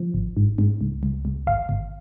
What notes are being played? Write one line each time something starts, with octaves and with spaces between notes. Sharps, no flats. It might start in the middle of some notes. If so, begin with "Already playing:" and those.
Already playing: F3
G#1
G#2
G#2
C#2
C#2
C#2
G#1 F5
G#1